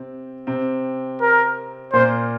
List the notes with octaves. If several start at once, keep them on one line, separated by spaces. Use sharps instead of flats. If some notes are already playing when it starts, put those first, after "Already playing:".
Already playing: C3 C4
C3 C4
A#4
A#2 A#3 C5